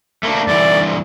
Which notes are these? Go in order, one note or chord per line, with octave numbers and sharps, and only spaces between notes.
A3 A#3 D4
G2 D3 E3 D5